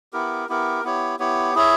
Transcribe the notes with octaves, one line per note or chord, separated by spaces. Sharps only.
B3 E4 G4 A#4
B3 E4 G4 A#4
B3 E4 G4 C#5
B3 E4 G4 C#5
E4 G#4 C#5 E5